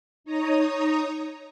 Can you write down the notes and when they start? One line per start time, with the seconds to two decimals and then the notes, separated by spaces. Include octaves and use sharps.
0.24 D#4 C#5 A#5 D#6